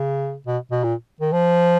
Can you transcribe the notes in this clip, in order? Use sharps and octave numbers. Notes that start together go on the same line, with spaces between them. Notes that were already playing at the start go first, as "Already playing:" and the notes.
Already playing: C#3
B2
B2
A#2
D#3
F3